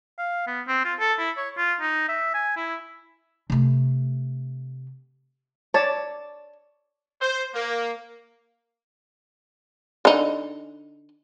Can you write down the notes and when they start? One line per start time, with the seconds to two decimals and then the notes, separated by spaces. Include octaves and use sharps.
0.18 F5
0.47 B3
0.68 C4
0.85 F4
1.00 A4
1.19 E4
1.37 C#5
1.57 F4
1.81 D#4
2.09 E5
2.34 G#5
2.57 E4
3.50 C3 A3
5.74 C#5 D5 A5
7.21 C5
7.54 A#3
10.05 D3 D#4